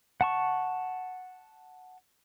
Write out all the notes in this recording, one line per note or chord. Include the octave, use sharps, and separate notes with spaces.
F#5 A5 C#6